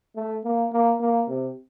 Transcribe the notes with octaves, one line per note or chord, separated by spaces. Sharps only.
A3
A#3
A#3
A#3
C3